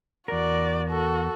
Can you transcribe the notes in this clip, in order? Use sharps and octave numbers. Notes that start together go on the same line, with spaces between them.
E2 F#4 A#4 D5
F#4 A4